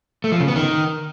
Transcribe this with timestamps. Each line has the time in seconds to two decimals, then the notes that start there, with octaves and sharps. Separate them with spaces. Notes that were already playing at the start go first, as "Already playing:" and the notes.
0.24 A3
0.32 F3
0.40 C#3
0.48 B3
0.56 D#3